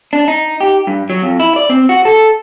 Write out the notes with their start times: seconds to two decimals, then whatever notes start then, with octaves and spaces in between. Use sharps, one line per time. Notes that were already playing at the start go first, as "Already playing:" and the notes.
0.13 D4
0.28 D#4
0.61 G4
0.87 G2
1.10 F#3
1.22 F2
1.40 E4
1.56 D5
1.69 C4
1.89 F#4
2.05 A4